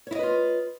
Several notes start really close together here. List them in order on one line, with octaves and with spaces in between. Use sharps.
C#5 E4 D#5 B4 F4